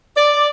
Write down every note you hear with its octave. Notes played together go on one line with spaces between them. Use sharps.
D5